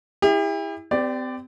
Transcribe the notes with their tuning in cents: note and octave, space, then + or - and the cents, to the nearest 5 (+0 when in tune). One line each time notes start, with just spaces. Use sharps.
E4 -10 G4 +45
C4 -40 G4 +0 D5 +0